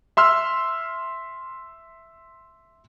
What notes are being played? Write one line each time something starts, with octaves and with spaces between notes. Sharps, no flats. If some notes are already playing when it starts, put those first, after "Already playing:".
E5 C6 E6 F6